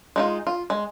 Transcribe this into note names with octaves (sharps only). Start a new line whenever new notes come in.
G#3 D#4 F4
F4
G#3